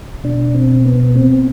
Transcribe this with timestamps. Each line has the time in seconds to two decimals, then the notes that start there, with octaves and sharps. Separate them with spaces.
0.24 B2 D4
0.54 C4
0.85 B3
1.15 C4